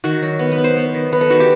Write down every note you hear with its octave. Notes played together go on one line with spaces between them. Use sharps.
D#3 F#4
F#3
B3
B4
B3
C5
B3
D#3
B3 B4
A4
D#3 F#4
G4